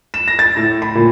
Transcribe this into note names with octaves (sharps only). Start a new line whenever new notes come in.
E7
A#6
A6
A2
B5
A#2